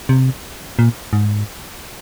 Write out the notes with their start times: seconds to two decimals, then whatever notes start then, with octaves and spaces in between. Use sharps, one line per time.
0.09 C3
0.79 A#2
1.13 G#2